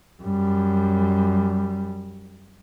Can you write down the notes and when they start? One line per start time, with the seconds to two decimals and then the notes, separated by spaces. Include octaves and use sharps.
0.23 F#2 G3